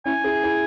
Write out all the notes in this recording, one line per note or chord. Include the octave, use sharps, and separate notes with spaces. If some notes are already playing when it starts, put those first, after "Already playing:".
C#4 E4 G#5
E4 G#4
E4 G#4